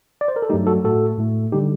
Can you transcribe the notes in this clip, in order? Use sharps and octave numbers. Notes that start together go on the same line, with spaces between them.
D5
C5
A#4
A4
G2 F#3 A3 D#4 G4
F#4 A4
A2 A3 F#4 A4
A2 A3
D3 G3 D#4 G4